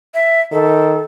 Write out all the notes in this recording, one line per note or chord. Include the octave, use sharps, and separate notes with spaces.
E5
D#3 A4